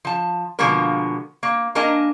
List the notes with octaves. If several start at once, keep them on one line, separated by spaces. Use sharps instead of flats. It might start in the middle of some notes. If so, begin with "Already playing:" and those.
F3 A5
B2 D3 F3 G#3 A#3 A#4
A#3
A#3 D4 A#4 D#5 G#5